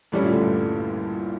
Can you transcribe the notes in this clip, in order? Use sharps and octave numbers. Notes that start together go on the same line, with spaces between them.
A2 G3 C#4 E4
A#1 A#2
D2 D3
G2